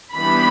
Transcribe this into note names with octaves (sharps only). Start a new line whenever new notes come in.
E3 G3 B3 D4 B5